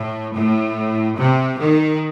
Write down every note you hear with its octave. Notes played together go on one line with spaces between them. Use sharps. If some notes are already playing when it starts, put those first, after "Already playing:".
Already playing: A2
A2
C3
D#3